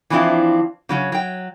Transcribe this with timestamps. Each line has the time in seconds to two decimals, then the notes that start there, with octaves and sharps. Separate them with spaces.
0.10 E3 F3 C4 D4 E4 F4
0.89 C#3 F#3 C#4
1.12 F#3 G5